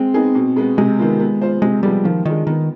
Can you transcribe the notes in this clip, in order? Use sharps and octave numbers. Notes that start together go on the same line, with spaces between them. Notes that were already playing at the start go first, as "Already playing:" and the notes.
Already playing: G#3 C4
B3 D#4 G#4
B2
G#3 B3
C3 G#3
D#3 B3 F4
B3
F4 C5
C3 G#3
F3 G3 G#3 B3
D#3 F3
D#3 G#3 D4 F4
D#3 B3